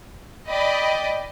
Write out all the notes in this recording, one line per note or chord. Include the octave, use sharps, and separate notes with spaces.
D5 D#5 G5 B5